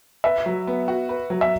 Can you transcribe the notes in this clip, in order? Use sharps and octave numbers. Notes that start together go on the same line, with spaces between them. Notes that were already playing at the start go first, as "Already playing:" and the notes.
B4 E5
F#3
B3
F#4
B4
F#3
E5